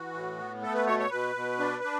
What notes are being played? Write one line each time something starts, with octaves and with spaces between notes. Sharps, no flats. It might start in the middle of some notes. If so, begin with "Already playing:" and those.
Already playing: E3 F#4
A2
B3
A3 A4
B4
B2 C#5
C#5
B2 B4
B2
D4
D4